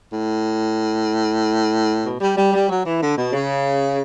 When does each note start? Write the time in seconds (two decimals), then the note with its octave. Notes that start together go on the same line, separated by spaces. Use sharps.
0.11 A2
2.04 B2
2.20 G3
2.36 G3
2.52 G3
2.68 F#3
2.84 E3
3.00 D3
3.16 B2
3.33 C#3